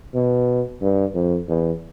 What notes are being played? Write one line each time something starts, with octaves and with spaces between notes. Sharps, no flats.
B2
G2
F2
E2